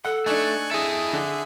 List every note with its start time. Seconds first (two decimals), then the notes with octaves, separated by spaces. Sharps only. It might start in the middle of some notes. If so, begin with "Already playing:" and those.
0.05 A4 F#5
0.26 A3 D4 D#4 G#5 C#6 F#6
0.71 E4 G#4 A4 D#5 E5
1.13 D3